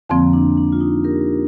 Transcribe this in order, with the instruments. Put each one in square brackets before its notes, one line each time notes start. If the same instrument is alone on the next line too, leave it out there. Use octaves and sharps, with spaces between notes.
[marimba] F2 D3 F3 C4 [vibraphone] A#3
[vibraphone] D4
D4
F4
D#4
G4 A#4